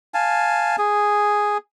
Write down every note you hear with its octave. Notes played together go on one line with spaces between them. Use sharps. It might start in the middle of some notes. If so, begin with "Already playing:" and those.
F5 G#5 A5
G#4